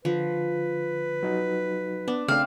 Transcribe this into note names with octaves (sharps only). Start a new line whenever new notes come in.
D3 F3 B4
F#3 D#4 F#4
B3 D4
C#3 A3 C4 D4 F5